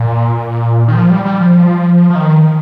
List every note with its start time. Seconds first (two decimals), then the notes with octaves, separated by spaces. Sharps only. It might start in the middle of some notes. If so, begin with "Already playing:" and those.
Already playing: A#2
0.88 D#3
0.95 F3
1.10 G3
1.25 G3
1.41 F3
2.10 F3
2.15 D#3